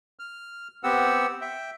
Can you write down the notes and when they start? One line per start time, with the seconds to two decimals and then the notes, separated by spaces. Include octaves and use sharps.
0.19 F6
0.84 B3 C4 G4 F#5 E6
1.41 E5 G5